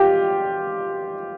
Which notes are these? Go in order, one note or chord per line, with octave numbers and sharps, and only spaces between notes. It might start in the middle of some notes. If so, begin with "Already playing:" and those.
Already playing: F4 G4